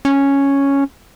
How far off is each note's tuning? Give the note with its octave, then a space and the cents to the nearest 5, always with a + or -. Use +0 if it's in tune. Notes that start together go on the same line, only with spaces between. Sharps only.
C#4 +0